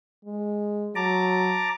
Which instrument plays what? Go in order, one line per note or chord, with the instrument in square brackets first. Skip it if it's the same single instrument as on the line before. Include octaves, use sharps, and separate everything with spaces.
[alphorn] G#3
[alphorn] F#3 [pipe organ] A5 A#5 D6